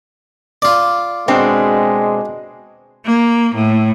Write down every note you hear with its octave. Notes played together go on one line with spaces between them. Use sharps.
F4 D5
B2 G#3 C4 D4
A#3
A2